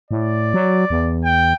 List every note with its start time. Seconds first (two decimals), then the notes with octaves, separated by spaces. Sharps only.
0.11 A2 D5
0.54 F#3
0.90 E2
1.24 G5